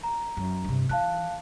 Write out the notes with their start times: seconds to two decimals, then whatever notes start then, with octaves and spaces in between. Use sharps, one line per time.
0.03 A#5
0.37 F#2
0.64 G2 C3
0.89 E3 F5 A5 F#6